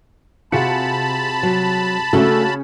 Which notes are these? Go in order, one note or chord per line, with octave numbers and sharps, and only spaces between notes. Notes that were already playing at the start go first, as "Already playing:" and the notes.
C3 F4 F#4 G#4 A5 B5 C#7
F#3
C#3 A3 C#4 D4 F#4 A4